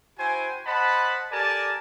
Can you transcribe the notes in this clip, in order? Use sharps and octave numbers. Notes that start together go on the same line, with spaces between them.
E4 F#4 C5 G5 G#5
C5 D#5 F#5 A5 B5
G4 A4 A#4 D5 G#5 A5